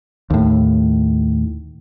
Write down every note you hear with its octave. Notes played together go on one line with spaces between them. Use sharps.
D#2 A2